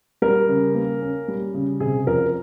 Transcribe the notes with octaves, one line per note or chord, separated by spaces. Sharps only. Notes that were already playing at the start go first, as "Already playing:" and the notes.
G3 A#4
C#3
A#3
C#4
G3
C#3
C3 G#4
F2 A#4